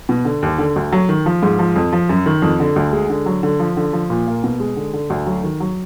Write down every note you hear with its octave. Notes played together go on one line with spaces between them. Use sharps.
B2
D3
D#2
D3
D2
F#3
D#3
F3
G#2
F3
F2
F3
F#2
D#3
F2
D3
D2
G#3
D3
F#3
D3
F3
D3
F3
A#2
A#3
B2
G#3
D3
D3
D2
F#3
D#3
F#3